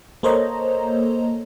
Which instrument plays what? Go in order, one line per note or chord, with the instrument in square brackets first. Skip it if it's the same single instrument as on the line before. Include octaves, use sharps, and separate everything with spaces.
[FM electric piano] A#3 A4 C5 C#5 D#5 A#5